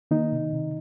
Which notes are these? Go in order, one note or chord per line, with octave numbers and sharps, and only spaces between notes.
D#3 A#3 D#4
C3
C3